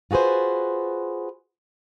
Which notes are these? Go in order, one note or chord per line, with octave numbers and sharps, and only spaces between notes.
F4 F#4 G#4 B4 C5